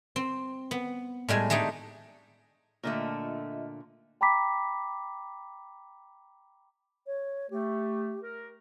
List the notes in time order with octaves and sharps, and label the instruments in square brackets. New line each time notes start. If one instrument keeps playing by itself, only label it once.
[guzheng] C4
B3
A2 G3 G#3 G#5
G#3 A3 D4 D#4 G4
[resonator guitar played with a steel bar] A#2 D3 A3 [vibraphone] F4 D#5 E5
[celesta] G5 A#5 B5 D6 B6
[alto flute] C#5
[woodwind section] A3 [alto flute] G4
[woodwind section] A#4